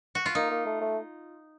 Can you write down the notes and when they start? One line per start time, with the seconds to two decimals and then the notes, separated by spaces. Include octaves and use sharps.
0.15 F#4
0.26 F4
0.35 A#3 D#4
0.51 A#3
0.66 A3
0.81 A3